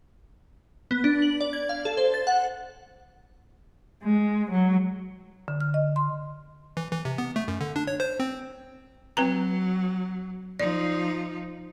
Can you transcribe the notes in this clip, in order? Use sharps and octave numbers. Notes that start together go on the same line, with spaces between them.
B3
D4
F#7
D5
G#6
F5
A4
C5
A6
F#5
G#3
F#3
D3
F6
D#5
C6
E3
E3
C3
B3
A3
F#2
D3
D4
C#5
C5
C4
F#3 C4 B4 A#5
F3 D#4 D5